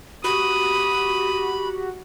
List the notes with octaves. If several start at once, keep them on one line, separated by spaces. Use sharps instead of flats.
F#4 G4 B5 D#6